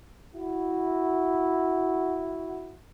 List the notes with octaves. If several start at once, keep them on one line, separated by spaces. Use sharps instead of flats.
E4 F#4